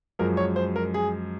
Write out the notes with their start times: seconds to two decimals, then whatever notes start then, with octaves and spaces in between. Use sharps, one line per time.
0.19 F#2 F3 G#3 A#4
0.37 C#5
0.56 C5
0.76 A#4
0.94 G#4